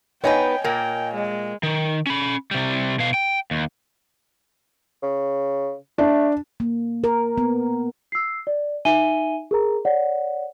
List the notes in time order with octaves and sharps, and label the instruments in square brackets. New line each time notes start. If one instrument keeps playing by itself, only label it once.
[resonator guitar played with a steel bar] B3 D#4 B4 [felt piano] C#5 D#5 G#5 [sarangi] G5
[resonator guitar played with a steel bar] A#2 A#3 [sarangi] G5
[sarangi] G#3
[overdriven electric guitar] D#3
C#4 B5
C3 G3
B2 F5
G5
D#2
[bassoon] C#3
[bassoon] A3 [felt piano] D4
[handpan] A#3
A#4
B3
[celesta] E6 C7
D5
D#4 E5 G#5 D#7 G7
G#4 A#4 A#5
C#5 D5 F#5